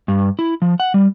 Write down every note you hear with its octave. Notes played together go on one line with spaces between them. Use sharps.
G2
E4
F3
F#5
G3